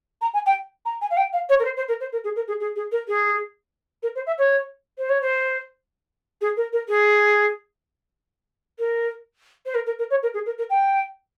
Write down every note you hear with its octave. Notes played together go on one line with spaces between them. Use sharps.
A#5
G#5
G5
A#5
G#5
F5
G5
F5
C#5
A#4
C5
C5
A#4
C5
A#4
G#4
A#4
G#4
G#4
G#4
A#4
G#4
A#4
C5
E5
C#5
C5
C#5
C5
G#4
A#4
A#4
G#4
A#4
C5
A#4
A#4
A#4
C#5
A#4
G#4
A#4
A#4
G5